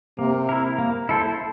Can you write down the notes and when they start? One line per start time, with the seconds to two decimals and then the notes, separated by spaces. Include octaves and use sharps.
0.18 C3 A#3
0.49 E4 A#4
0.78 A#3
1.09 E4 A4 C5